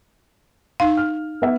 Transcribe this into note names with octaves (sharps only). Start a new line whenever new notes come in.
D#4 F5 C6
F6
B3 E5